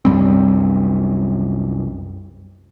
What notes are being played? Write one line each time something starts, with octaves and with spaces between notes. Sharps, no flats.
C2 F#2 G3 C4